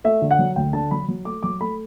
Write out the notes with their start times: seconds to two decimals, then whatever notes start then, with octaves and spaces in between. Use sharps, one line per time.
0.04 A3 E5
0.22 D3
0.31 F#5
0.39 F#3
0.56 D2 G5
0.73 D3 A5
0.91 F#3 B5
1.08 F#3
1.25 A3 D6
1.43 F#3 D6
1.61 A3 B5